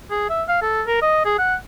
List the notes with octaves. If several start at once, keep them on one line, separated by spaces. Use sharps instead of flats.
G#4
E5
F5
A4
A#4
D#5
G#4
F#5